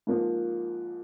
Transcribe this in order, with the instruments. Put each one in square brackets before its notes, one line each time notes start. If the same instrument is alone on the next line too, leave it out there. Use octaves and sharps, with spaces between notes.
[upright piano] G#2 F3 A#3